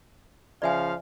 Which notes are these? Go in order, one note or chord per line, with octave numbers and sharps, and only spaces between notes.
C#3 F3 D5 E5 F5 G#5